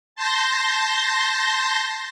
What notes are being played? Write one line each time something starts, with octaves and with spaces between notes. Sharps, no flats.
A5 C6 G6 A#6